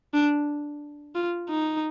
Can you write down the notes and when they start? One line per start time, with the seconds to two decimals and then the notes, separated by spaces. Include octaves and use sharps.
0.14 D4
1.15 F4
1.50 D#4